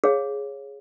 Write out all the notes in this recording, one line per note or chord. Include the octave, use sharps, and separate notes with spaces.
G#4 C#5 F5